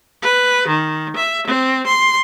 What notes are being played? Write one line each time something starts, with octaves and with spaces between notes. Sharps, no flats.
B4
D#3
E5
C4
C6